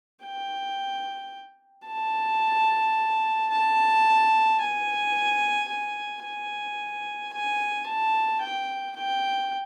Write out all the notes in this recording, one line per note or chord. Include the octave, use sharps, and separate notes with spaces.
G5
A5
A5
G#5
G#5
G#5
G#5
A5
G5
G5